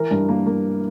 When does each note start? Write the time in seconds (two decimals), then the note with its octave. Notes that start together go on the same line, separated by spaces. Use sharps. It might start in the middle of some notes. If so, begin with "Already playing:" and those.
Already playing: E3 A#4
0.11 G2
0.29 A#3
0.46 A#3